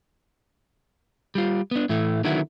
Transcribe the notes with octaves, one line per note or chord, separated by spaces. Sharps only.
G3 F4
B3 D4
A2 E3 A3
D3 D#3 F#3 B3 E4